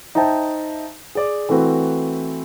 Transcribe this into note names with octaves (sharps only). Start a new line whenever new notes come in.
D#4 C5 E5 G5 A5
G#4 D5
E3 A3 C4 F#4 B4